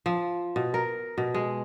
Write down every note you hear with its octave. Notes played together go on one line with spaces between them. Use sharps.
F3
B2
A#4
B2
G#3